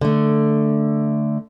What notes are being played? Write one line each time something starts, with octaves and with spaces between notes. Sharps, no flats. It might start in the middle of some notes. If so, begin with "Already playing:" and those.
D3 A3